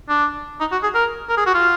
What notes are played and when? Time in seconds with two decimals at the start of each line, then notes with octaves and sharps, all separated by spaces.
0.09 D4
0.60 D#4
0.72 F#4
0.83 G#4
0.94 A#4
1.29 A#4
1.37 G#4
1.46 F#4
1.54 F4